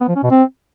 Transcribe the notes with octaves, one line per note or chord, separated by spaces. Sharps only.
B3
F3
C#4
B2
C4